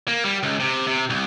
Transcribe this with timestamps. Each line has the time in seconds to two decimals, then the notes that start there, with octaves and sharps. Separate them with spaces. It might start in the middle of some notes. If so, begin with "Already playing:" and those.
0.08 A#3
0.25 G3
0.43 C#2
0.60 C3
0.87 C3
1.10 C2